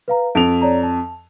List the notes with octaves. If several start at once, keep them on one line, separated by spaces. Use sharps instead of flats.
B4 F5 A#5
F2 D7 F7
C#5 D5 A#5
A5